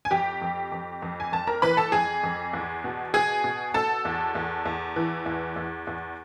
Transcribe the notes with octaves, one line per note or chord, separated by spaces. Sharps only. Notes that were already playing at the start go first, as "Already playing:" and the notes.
G#5
F2 G4 G5
F2
F2
F2
G#5
F2 A5
A#4 A#5
E3 B4 B5
A4 A5
F2 G#4 G#5
F2
E2
B2
B2 G#4 G#5
B2
B2 A4 A5
E2
E2
E2
E3
E2
E2
E2